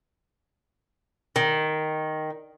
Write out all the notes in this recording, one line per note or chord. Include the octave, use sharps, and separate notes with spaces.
D#3